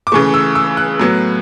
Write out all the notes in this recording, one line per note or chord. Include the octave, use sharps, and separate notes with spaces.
D6
C#3 E3 A3 C#6
E6
E6
F#6
A2 F#3 B3